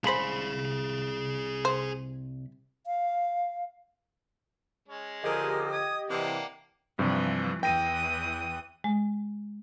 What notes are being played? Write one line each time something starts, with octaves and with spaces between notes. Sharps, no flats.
C2 G#3 G#4 C5 F5 B5
C5
F5
G#3 C#4
D3 F3 G4 G#4 A#4 D#5
D#6 G#6
C3 E3 A#3 D4 F#5 G5
G2 C3 E3 F3
E2 E3 G5 D#6 A#6 D#7
G#3